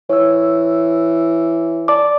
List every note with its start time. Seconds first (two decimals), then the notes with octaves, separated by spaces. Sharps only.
0.09 E3 C#5 E6
1.88 D5 A5 D6